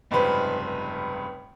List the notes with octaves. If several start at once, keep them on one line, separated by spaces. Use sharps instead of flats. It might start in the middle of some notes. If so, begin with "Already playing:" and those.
F1 C#2 G2 C#3 B4 C5